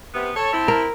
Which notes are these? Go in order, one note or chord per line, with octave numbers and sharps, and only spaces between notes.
C3 B3
A4 C#5 A5
C4 E4
A#4